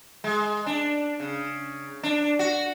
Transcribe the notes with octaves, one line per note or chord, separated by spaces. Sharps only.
G#3
D4
C#3
D4
F#4